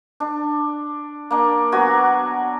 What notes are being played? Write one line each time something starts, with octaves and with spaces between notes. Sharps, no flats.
D4
A#3 D4
F#3 B3 F#4 G#5